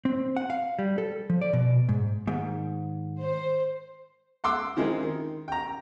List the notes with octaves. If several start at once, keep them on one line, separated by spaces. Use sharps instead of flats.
C4
F#5
F5
G3
A4
F3
D5
B2
G#2
G#2 D#3
C5
F#5 C6 D6 E6
D#3 F3 G#3 C4 E4
D#3
G5 A#5